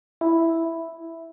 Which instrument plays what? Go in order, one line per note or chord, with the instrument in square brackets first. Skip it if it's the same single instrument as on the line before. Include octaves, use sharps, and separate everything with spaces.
[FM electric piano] E4